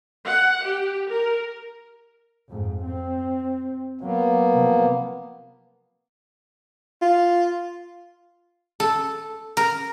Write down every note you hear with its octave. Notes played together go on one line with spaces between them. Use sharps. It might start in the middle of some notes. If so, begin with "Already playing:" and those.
F#5
G4
A#4
F2 G#2
C4
F#3 A#3 B3
C3 F3
F4
A4
A#4